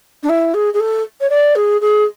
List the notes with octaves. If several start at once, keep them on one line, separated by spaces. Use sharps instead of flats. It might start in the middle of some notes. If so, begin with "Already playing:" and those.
D4
E4
G#4
G#4
A4
C#5
D5
G#4
G#4